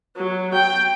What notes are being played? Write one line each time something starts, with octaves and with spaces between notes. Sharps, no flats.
F#3
G5